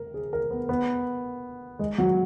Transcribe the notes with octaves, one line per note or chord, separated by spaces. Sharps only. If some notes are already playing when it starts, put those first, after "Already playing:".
Already playing: A#4
G#4
A#4
B3
B3
G#3
F#3